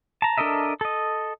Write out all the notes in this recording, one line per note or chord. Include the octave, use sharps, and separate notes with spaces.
A5 A#5
D4 A4 A#4 D#5 E5
A4 D#5